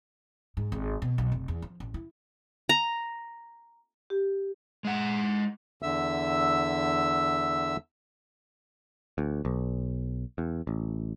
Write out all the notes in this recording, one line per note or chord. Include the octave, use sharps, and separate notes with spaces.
G#2
G#1
B2
B1
F1
E2
F3
A1
E4
A#5
G4
G#3 F#5
E2 D3 E5 E6
D2
B1
E2
A1